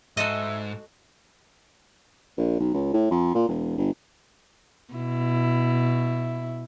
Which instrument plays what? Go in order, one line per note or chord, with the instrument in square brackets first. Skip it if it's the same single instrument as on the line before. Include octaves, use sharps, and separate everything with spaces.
[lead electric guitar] G#2 [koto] F#4 A4 D#5 [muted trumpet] E5
[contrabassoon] A#1
B1
C#2
A2
F2
A#2
E1
G1
[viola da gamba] B2 E4